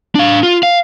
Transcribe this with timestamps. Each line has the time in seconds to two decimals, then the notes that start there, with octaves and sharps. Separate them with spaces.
0.15 D4 F5
0.43 F4
0.63 F5